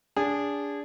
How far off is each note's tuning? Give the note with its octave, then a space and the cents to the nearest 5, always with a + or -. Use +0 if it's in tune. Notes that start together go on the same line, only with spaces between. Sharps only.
D4 -25 G#4 -25